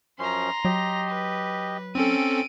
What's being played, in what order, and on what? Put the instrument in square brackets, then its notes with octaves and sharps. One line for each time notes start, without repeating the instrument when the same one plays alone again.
[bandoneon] F#2 F3 C#4 [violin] A#5 C6
[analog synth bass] F#3 [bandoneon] G4 D#5
[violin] B4
[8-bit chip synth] C4 C#4 A4 [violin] D7 D#7